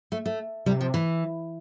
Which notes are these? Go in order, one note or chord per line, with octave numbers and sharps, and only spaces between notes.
A3
A3
C3 G3
F3
E3